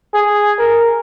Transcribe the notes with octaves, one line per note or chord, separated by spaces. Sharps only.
G#4
A#4